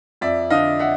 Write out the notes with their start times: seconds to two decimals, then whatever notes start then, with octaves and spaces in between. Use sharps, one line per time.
0.21 F2 D5 E5
0.50 D3 D#5 F5
0.79 E5 F#5